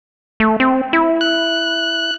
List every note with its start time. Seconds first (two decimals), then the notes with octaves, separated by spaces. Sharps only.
0.40 A3
0.60 C4
0.93 E4
1.21 F#6